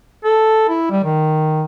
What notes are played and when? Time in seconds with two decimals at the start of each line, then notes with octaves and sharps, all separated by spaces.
0.24 A4
0.69 E4
0.91 G3
1.04 D#3